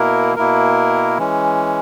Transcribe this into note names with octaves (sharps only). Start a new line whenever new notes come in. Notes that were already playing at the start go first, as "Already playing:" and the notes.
Already playing: B2 A#3 E4 A#4
B2 A#3 E4 A#4
E3 G#3 C#4